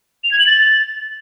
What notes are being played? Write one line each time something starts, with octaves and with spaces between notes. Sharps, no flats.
F7
G#6
F#7
A6